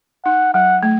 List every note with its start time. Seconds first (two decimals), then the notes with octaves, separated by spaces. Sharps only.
0.25 D#4 F#5
0.54 F#3 F#5
0.83 A3